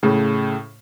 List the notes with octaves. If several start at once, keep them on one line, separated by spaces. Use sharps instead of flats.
A2 C#3